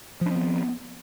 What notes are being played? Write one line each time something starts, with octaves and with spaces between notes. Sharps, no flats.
F3 B3 C4 D4